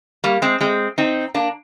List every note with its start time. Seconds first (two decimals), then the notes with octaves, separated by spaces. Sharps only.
0.24 G3 A#3
0.42 G#3 C4
0.61 G#3 C4
0.98 C4 D#4
1.34 A#3 D4